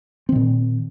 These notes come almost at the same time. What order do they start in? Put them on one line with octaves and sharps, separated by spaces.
C4 D#3 A#2